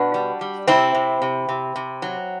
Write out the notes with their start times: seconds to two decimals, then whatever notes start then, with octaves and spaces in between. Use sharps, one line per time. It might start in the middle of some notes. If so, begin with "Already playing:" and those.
Already playing: B2 D4 F#4
0.14 G3
0.41 G3
0.67 C3 C4 E4
0.95 C3
1.22 C3
1.49 C3
1.76 C3
2.02 F#3